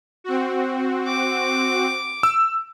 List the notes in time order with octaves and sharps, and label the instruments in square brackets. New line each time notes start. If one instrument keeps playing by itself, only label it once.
[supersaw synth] C4 F#4
[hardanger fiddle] D6
[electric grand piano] E6